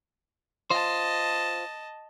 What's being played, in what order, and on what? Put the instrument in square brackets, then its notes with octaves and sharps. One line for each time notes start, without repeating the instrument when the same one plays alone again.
[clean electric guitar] F4 C5 [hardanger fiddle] D#5 A5